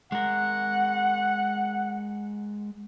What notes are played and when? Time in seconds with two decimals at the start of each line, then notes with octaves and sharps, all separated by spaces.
0.12 G#3 A#4 F#5